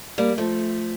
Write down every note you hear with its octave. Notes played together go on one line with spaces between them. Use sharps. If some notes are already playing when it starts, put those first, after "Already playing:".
G3 A#3
F3 A3